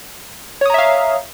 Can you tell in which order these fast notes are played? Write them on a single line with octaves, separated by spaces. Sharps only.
C#5 D#6 A#5 E5 F5